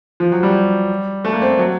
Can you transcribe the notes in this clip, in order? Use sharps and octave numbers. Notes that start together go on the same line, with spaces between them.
F3
F#3
G3
A3
A#3
C4
F#3